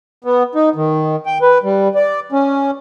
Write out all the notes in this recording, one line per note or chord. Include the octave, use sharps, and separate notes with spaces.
B3
D#4
D#3
G5
B4
G3
D5
C#4